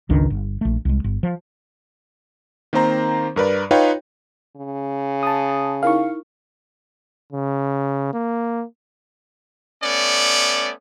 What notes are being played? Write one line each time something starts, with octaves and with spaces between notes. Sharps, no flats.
G1 C#2 D#3 D4
G1
A#1 A3
C2 G#3
G1
F3
D#3 A#3 C4 C5 A#5
G2 A#4 B4 D5
D#4 F4 B4 C#5 F5 G5
C#3
A5 D#6
D#4 E4 A#4 F5 C#6
C#3
A#3
A3 B3 C#4 D5